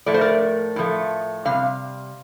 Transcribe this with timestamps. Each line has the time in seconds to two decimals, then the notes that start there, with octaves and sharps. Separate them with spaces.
0.06 A2 F3 A3 D5
0.14 C5
0.21 A#4 D5
0.76 A2 F3 A3
1.45 C3 G3 F5